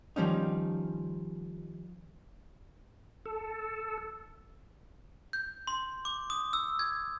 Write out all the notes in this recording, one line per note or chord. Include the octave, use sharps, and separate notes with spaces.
D#3 F3 G3 C#4 D#4
A4
G6
C6
D6
D#6
E6
G#6